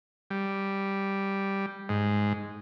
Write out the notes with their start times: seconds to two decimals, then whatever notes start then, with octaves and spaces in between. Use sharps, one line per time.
0.31 G3
1.89 G#2